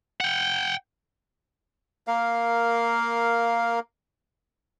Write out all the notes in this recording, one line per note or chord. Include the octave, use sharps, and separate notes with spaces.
F#5 G5
A#3 A#4 F5